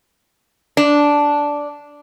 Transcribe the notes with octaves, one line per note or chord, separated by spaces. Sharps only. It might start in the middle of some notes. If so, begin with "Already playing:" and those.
D4